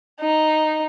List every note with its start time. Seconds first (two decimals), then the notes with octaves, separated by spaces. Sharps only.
0.20 D#4